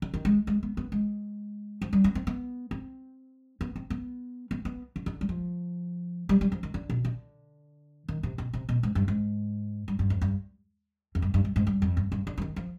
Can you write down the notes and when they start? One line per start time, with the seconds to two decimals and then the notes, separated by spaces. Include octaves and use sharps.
0.02 D3
0.14 D#3
0.25 G#3
0.47 G#3
0.63 B3
0.77 B3
0.92 G#3
1.81 F3
1.93 G3
2.04 B3
2.15 C4
2.27 B3
2.71 C4
3.61 B3
3.76 C4
3.90 B3
4.51 B3
4.65 B3
4.96 D3
5.06 D3
5.21 G3
5.29 F3
6.29 G3
6.41 G3
6.52 F3
6.63 D#3
6.74 D3
6.90 B2
7.05 D3
8.08 D#3
8.23 C3
8.38 B2
8.53 C3
8.69 B2
8.83 G#2
8.95 G2
9.08 G#2
9.88 G2
9.99 G2
10.10 F2
10.21 G2
11.15 F2
11.22 G2
11.34 G2
11.45 G2
11.56 G#2
11.67 G2
11.82 F2
11.97 G2
12.12 G2
12.27 D3
12.37 F3
12.42 D#3
12.56 F3